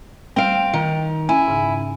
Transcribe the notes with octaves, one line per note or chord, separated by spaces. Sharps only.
G3 C4 F5 G5 D7
D#3
C#4 E4 G#5
G#2 C#3 D#4